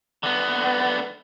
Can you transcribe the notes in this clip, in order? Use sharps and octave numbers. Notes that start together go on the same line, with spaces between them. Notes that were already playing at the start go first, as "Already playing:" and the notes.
D3 B3